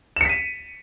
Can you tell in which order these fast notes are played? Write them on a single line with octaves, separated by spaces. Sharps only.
E7 C#7 B6 D#7